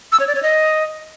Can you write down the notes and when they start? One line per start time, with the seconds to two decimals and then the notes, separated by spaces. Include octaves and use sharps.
0.12 E6
0.20 C#5
0.27 D5
0.35 C#5
0.43 D#5